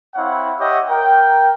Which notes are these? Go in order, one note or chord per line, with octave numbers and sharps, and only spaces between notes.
C4 E4 C#5 F5 F#5
G4 C#5 D#5 E5 F#5 G5
A#4 G5